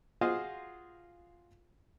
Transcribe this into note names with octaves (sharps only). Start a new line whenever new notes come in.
F4 F#4 G#4 C5 D#5 F5